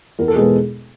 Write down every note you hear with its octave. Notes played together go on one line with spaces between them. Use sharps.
E2 A#4
A4
B2 G#3 B3 G#4